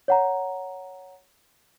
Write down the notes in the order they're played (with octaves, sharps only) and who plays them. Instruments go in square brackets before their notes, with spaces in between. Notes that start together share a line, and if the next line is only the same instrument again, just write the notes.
[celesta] C#5 F#5 A#5